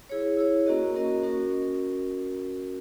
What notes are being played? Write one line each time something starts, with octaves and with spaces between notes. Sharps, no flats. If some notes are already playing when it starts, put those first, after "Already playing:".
E4 G#4 C#5
E4 G#4 C#5
A#3 C#4 F#4 A#4 D#5
A#3 C#4 F#4 A#4 D#5
C#4 F#4 A#4
A#4